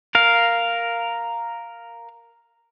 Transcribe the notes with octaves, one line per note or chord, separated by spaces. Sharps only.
A#4 F5